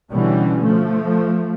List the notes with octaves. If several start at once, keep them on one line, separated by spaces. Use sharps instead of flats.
B2 D3 E3 G3 C#4
F3 A3